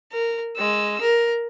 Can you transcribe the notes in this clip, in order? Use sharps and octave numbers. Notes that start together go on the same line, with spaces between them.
A#4
G#3 E6
A#4